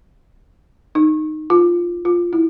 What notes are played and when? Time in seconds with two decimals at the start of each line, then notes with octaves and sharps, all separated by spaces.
0.95 D#4
1.50 F4
2.05 F4
2.33 E4